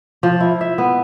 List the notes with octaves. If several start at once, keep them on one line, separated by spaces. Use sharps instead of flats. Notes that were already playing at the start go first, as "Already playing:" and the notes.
F3
E4
E5
B3